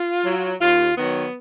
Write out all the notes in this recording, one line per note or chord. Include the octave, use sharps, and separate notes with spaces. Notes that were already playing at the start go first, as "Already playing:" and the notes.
Already playing: F4
F#3
D#2 F4
D#3 F#3 B3